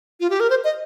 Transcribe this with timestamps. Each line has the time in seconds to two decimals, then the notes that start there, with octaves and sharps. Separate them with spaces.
0.20 F4
0.30 G4
0.40 A#4
0.50 C5
0.64 D#5